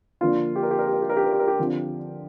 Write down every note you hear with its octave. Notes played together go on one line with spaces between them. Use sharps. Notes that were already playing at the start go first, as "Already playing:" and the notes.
D3 F3 A#3 D4 F4
G4
A#4
G4
A#4
G4
A#4
G4
A#4
G4
A#4
G4
A#4
G4
D3 F3 C4